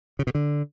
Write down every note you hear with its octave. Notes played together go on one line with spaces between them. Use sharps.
C#3
B2
D3